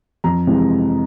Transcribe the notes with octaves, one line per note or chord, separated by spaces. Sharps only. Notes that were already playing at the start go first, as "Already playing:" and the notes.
F2 A#5
C3 E3 G#3 C4